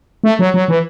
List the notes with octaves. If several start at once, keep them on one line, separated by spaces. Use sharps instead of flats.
A3
F#3
F#3
E3